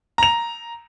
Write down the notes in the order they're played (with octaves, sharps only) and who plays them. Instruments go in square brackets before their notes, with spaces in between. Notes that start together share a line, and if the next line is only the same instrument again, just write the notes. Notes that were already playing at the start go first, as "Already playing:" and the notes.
[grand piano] A#5 F7